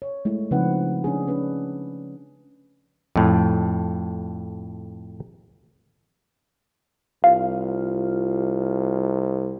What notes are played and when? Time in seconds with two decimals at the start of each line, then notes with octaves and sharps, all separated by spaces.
0.02 C#5
0.25 G#3 A3 E4
0.51 C#3 F3 C4 D#4 B4 F#5
1.04 C#4 D4 G#4
1.27 C#4 D4 B4
3.16 F2 A2
7.24 C2 F4 F5